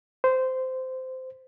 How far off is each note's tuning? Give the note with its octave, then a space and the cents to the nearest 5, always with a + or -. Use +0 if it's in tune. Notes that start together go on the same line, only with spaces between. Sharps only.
C5 -15